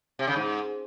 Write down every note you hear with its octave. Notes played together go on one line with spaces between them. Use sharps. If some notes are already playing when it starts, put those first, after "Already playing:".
C3
C#3
G#2